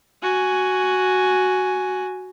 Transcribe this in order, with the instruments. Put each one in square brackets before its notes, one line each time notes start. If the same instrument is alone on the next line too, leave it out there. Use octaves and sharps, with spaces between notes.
[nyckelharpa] F#4 G#5